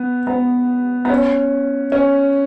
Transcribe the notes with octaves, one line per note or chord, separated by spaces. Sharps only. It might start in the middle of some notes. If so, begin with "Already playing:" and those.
Already playing: B3
B3
B3
C#4
C#4